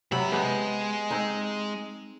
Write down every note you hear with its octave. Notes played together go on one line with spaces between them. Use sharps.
G2 C3 F#3 B5
G#3 B3 G4 B4
C4 D#4